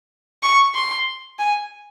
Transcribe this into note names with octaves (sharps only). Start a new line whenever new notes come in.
C#6
C6
G#5